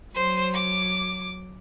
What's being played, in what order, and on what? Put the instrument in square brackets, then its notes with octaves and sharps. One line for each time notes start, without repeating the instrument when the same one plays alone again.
[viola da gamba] F#3 [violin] C5
[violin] D6